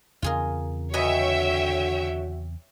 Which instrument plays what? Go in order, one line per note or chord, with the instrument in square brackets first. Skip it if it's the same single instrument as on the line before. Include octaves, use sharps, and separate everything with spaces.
[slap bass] E2 C#3 C4 [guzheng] F4 G#4 A#4
[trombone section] D3 F#4 [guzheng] B4 D#5 G#5 [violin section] C#5 E5 G5